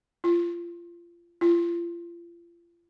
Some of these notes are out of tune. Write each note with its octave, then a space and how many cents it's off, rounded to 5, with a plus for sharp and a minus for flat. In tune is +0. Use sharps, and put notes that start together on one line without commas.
F4 -25
F4 -35